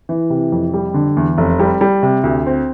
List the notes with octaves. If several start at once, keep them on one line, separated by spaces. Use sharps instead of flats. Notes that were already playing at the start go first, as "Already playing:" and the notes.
E3
C3
F2
G3
D3
E2
F1
G3
G3
C3
D2
C4